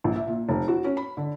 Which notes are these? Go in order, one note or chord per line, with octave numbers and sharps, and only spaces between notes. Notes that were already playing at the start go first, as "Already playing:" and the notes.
A#1
E5
A#2
F1
F#4
C#4
B5
D3